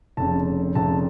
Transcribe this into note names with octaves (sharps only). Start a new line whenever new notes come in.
F1 F2 C#3 A5
F1 F2 C#3 A5